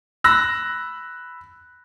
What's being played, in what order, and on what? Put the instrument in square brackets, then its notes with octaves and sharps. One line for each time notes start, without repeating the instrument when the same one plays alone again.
[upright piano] B5 E6 F#6 A#6